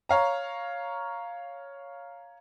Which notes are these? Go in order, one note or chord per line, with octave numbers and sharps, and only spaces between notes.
C#5 F5 A#5